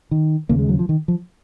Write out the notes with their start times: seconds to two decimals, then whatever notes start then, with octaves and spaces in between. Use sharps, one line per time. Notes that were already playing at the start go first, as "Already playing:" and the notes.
0.11 D#3
0.49 D#2 C#3 A#3
0.59 G#3
0.69 F#3
0.79 F3
0.89 D#3
1.08 F3